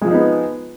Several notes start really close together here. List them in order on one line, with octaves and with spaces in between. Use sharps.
G#3 F3 G#4 D#4 B3